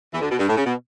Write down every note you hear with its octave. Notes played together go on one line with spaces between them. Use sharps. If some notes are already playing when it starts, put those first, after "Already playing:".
E2 E3
D2 D3
B2
G2
A2
C#3
B2